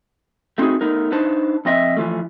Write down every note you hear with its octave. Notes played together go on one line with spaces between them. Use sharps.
A3 C4 D#4 F4 F#4 G#4
A3 B3 D#4 A#4
D4 D#4 B4 C5 A5
F2 C4 D#5 E5
E3 F3 A3